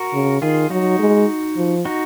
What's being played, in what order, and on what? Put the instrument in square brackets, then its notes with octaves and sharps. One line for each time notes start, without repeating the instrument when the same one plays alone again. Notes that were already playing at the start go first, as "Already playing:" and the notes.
Already playing: [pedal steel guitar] F#4 A#4
[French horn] C#3
[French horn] D#3 [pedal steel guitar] F4 G#4
[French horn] F#3 [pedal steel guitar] D#4 F#4
[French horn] G#3
F3
[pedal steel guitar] D#4 F#4